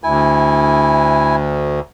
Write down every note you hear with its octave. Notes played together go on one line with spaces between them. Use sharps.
D2 E4 G#5